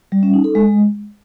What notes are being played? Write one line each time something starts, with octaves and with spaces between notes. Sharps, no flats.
G3
C#4
D#4
A4
G#3